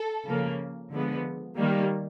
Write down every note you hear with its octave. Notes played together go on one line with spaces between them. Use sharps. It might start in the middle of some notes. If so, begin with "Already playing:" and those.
Already playing: A4
C#3 F3 A#3
D3 F3 G#3 B3
D#3 G3 A#3